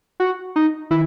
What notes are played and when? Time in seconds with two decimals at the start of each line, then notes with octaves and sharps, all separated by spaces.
0.20 F#4
0.56 D#4
0.90 D#3 E4